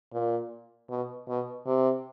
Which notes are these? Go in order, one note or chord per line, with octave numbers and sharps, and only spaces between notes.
A#2
B2
B2
C3